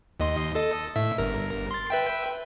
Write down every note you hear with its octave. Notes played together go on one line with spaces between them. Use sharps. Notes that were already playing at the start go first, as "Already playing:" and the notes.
D#2 D#5 C6
A4 D#5
A2 E5 E6
G1 A#4
C6 A6
B4 E5 G5